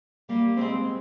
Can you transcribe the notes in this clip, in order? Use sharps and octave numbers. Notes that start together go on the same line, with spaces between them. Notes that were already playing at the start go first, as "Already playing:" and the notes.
G3 A#3
G#3 C4